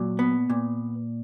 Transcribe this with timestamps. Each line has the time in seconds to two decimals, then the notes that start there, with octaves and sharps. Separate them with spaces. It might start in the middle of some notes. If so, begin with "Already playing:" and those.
Already playing: A#2 F#3
0.19 B3
0.50 A#2